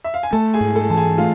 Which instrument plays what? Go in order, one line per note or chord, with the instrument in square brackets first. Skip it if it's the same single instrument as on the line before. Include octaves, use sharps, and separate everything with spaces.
[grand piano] E5
F5
G#5
[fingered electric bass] A3 [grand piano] A4 A5
[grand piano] G#4 G#5
[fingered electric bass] G#2
[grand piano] A4 A5
[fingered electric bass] E3 [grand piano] A5
[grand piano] G#4 G#5
[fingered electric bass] A3 [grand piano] F4 F5